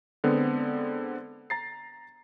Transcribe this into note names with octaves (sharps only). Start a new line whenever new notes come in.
D3 G#3 B3 C4
A#5 A6 C7